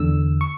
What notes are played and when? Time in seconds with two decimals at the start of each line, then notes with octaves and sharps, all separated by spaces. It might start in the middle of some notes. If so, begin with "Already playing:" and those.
Already playing: E2 D3 E6
0.41 C#6